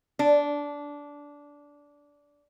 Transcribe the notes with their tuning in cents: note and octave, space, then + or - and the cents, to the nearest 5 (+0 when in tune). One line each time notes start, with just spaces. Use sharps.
D4 -15